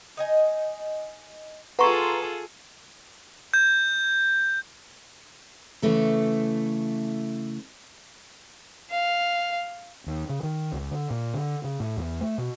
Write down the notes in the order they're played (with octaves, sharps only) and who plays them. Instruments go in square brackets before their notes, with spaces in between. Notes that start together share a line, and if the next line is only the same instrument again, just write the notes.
[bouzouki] D#4 D#5 G#5
[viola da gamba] F4 G#4 A4 [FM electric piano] B4 A#5 C6 [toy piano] F#5 C#6
[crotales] G6
[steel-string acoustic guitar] C#3 E3 A3 A4
[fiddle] F5
[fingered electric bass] D#2
C#3
D#3
C#2
D3
A#2
D3
C#3
A2
E2
A3
B2